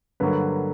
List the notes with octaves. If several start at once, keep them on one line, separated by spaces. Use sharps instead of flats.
G2 D3 F#3 A#3 B4